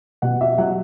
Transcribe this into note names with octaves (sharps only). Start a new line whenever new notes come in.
B2 F#5
E5
F#3 F#5